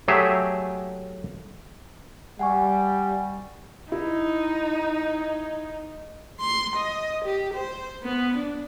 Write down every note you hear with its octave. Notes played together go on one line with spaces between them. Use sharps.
F#3 A3 G4 G#4 E5
G3 F#5 G#5 C#6
D#4 E4
C6
D#5
G4
C5
B3
D4